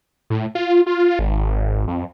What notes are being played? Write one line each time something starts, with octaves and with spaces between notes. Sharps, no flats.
A2
F4
F4
G#1
F2